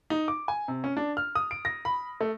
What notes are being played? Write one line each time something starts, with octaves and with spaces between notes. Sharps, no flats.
D#4
D6
G#5
C3
C#4
D4
F6
D#6
D7
A#6
B5
A3